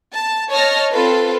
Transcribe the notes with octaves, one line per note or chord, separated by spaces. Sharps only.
A5
C#5 D#5 A5 F6 A#6
C4 F4 A4 B4